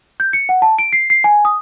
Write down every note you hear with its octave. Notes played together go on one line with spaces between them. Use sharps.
G6
C#7
F#5
A5
D7
C7
C7
G#5
D#6